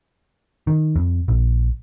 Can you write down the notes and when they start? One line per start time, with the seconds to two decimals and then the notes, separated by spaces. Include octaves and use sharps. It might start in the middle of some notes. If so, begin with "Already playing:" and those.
0.67 D#3
0.96 F2
1.28 A#1